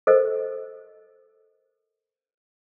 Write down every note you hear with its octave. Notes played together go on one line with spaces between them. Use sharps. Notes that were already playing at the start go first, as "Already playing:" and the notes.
A4 A#4 C5 D#5